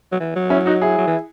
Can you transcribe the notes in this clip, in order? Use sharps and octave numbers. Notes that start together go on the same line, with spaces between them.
F#3
E3
F#3
C#4 E4
D#4 F#4
E4 G#4
F#3
E3